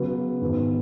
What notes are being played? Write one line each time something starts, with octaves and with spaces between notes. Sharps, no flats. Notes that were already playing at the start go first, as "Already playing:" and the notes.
Already playing: C#3 F#3 B3 F#4 B4
G#2 D#3 B3